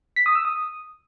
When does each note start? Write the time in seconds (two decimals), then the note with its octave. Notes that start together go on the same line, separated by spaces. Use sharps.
0.16 B6
0.26 D#6
0.35 E6
0.45 D#6